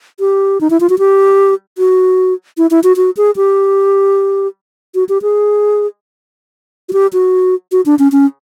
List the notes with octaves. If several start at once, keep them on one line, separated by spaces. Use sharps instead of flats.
G4
D#4
E4
F4
F#4
G4
F#4
E4
E4
F#4
F#4
G#4
G4
F#4
G4
G#4
F#4
G4
F#4
F#4
D4
C#4
C#4